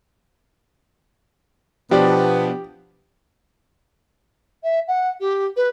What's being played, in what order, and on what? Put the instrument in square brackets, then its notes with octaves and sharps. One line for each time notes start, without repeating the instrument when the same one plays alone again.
[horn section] B2 B3 [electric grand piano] F3 D4 D5 [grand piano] G4
[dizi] E5
F#5
G4
B4